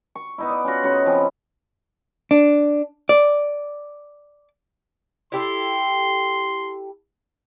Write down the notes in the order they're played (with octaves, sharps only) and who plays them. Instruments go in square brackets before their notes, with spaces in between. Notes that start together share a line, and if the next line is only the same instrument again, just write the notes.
[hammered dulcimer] C#6
B3 D#4 E4
D5
C#4 F4 F#4
C#3 D#4 F#4
F3 C4 C#4 B4
[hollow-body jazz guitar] D4
D5
[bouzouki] E4 G4 A4 [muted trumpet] C6